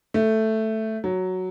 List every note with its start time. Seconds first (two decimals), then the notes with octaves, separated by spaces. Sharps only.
0.14 A3
1.04 F#3